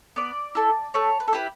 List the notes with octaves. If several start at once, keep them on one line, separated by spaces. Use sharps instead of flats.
B3 D5
E4 A4
A3 C#5
B4
A4
E4 G4 B4